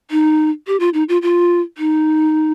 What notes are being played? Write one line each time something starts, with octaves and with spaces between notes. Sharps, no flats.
D#4
G4
F4
D#4
F4
F4
D#4